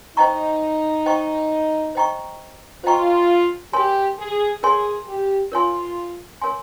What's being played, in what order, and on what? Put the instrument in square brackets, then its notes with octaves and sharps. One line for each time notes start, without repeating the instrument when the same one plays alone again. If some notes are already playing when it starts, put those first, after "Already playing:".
[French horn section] D#4 [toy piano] C5 D#5 G5 A#5 C#6
[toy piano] C5 D#5 G5 A#5 C#6
C5 D#5 G5 A#5 C#6
[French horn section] F4 [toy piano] C5 D#5 G5 A#5 C#6
[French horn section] G4 [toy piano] A#4 C#5 G#5 C6
[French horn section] G#4
[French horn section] G#4 [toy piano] A#4 C#5 G#5 C6
[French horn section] G4
[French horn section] F4 [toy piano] A#4 C#5 G#5 C6
[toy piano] A#4 C#5 G#5 C6